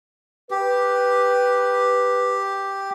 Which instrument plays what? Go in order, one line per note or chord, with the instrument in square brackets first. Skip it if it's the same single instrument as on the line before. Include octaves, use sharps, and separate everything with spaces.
[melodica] G4 [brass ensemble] B4